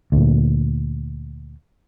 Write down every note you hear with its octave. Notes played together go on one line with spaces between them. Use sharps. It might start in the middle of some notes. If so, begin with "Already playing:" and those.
D2 A#2